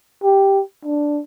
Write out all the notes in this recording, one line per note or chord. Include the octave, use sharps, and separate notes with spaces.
G4
D4